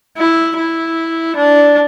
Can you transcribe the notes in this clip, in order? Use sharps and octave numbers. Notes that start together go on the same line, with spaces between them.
E4
E4
D4